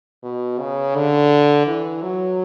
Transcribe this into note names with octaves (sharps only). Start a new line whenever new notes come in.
B2
C#3
D3
E3
F#3